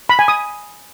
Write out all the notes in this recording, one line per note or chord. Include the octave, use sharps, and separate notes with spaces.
B5
G#5
D#6